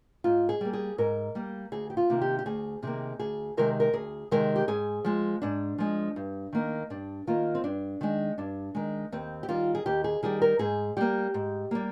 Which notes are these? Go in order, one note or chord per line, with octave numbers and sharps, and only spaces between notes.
G#2 F4
G#4
G3 A#3
G#4
G#2 A#4
G3 A#3
D2 G#4
G4
F4
C3 D#3 A#3
G4
G4
D2 G#4
C3 D#3 A#3 G#4
D2 G#4
C3 D#3 G#3 A#4
A#4
D2 G#4
C3 D#3 G#3 A#4
G4
G#2 G#4
F3 G#3
G#2 D4
F3 G#3
G2
D#3 A#3
G2 D4
D#3 A#3 F4
C4
G2 D4
D#3 G#3
G2 D4
D#3 G#3
D#2 C4
G4
D#3 G3 F4
G#4
D#2 G4
G#4
D#3 G3 G#4
A#4
G#2 G#4
G3 A#3 G4
G#2
G3 A#3